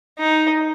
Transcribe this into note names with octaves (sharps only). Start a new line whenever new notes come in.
D#4